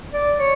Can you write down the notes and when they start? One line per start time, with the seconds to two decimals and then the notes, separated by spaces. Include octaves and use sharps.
0.13 D5
0.39 C#5